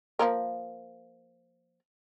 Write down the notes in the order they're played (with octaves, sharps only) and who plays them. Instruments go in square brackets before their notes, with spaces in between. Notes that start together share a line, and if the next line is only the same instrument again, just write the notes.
[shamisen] F3 A#3 A#4